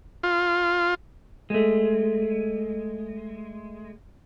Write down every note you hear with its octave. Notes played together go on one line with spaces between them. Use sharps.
F4
G#3 A3